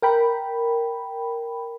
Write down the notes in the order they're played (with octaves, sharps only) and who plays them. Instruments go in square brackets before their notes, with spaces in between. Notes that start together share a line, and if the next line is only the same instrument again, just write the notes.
[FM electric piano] A#4 G5 B5